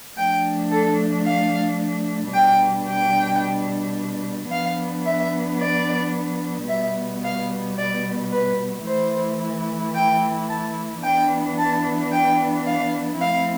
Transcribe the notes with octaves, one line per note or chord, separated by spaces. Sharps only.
F3 A3 D4 G5
A4
F5
B2 G3 D4 G5
G5
F3 B3 D4 F5
E5
D5
B2 G3 B3 E5
F5
D5
B4
E3 A3 E4 C5
G5
A5
E3 B3 D4 G5
A5
G5
F5
F3 A3 C4 E4 F5